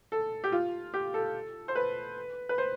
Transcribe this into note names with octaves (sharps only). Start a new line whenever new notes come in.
A4
G4
F4
G4
A4
C5
B4
B4
C5